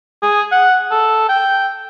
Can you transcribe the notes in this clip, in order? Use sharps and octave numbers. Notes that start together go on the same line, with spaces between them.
G#4
F#5
A4
G5